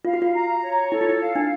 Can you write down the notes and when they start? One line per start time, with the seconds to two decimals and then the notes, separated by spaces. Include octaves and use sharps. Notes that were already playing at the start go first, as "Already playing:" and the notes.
0.05 F4 F5
0.14 F#4
0.22 F4
0.34 A#5
0.62 C#5
0.91 E4 A4
1.01 F4
1.09 E4
1.20 F5
1.35 D4